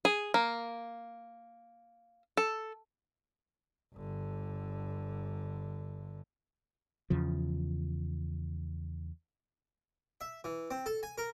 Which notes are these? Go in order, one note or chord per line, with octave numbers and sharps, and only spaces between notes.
G#4
A#3
A4
G1 D3
E2 C#3 F3
E5
E3
C4
A4
G#5
A#4